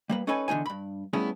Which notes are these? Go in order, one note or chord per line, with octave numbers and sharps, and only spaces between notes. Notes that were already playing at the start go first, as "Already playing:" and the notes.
G3 A#3 B4
C#4 D#4 A4 B4 C#5 G#5
E2 D3 G#3 D#4 G#5
G2 B5
G3 A3 B3 C#4 E4 G#4